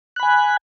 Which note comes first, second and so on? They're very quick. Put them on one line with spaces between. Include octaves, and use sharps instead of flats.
F#6 B5 G#5